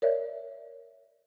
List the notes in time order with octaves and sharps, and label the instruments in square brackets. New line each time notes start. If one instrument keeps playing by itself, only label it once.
[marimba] A#4 C#5 D5 E5